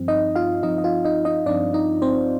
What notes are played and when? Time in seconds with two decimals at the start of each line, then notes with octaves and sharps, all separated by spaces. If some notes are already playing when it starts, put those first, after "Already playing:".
Already playing: G2 F3 C4
0.08 D#4 D#5
0.35 F4 F5
0.63 G2 F3 C4 D#4 D#5
0.78 D#5
0.84 F4 F5
1.05 D#4 D#5
1.25 D#4 D#5
1.46 G2 F3 C4 D4 D5
1.74 D#4 D#5
2.02 C4 C5